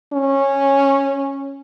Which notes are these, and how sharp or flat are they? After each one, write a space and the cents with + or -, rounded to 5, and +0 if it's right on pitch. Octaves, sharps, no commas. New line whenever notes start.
C#4 -10